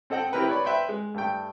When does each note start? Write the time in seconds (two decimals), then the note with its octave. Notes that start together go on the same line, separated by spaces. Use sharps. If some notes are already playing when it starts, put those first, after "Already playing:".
0.10 C4 A4 D#5 F#5 G5
0.33 C4 E4 G4 A#4 B4
0.48 B4 C#5 D5 B5
0.64 B4 C5 E5 G5 B5 C6
0.89 G#3
1.14 G2 A3 G5